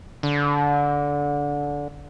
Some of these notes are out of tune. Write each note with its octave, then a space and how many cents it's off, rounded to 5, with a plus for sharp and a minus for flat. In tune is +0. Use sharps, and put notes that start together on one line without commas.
D3 -20